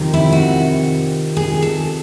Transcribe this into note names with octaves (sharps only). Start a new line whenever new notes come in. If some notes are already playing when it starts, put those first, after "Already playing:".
Already playing: F2 C3 D#3
E4
F#4
G#4
A4